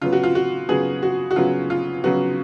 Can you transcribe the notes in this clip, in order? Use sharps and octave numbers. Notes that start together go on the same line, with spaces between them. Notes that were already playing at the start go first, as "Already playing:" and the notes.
C#3 F#3 B3 F4
F#4
F4
F#4
C#3 F#3 B3 F#4 G#4
F#4
F#4
C#3 F#3 B3 F4
F4
C#3 F#3 B3 F#4